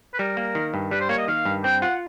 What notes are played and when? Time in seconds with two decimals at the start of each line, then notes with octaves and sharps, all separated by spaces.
0.14 B4
0.19 G3 A#4
0.37 A#3
0.55 D#3
0.74 G2
0.91 G3 B4
1.00 C5
1.09 A#3 C#5
1.18 D#5
1.28 D#3 F5
1.45 G2
1.64 C4 G5
1.82 F4 F#5